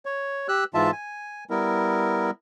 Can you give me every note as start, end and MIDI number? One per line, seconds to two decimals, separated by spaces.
0.05 0.47 73
0.48 0.64 67
0.48 0.64 88
0.48 0.64 90
0.74 0.91 44
0.74 0.91 52
0.74 0.91 65
0.74 0.91 76
0.74 0.91 81
0.92 1.44 80
1.50 2.31 55
1.50 2.31 59
1.50 2.31 64
1.50 2.31 70